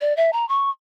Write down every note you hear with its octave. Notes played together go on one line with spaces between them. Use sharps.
D5
E5
A#5
C#6